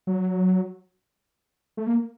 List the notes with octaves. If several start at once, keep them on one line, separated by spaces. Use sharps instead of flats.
F#3
A3
A#3